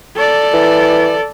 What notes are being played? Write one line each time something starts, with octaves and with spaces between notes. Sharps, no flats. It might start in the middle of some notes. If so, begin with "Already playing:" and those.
A4 D5
E3